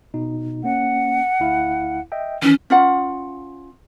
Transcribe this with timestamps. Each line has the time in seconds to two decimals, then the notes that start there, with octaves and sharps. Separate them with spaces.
0.14 B2 D#4
0.64 A#3 C#4 F#5
1.40 D2 E4 F5
2.12 D#5 E5 G5
2.42 D#3 E3 C#4
2.70 C#4 F4 F#5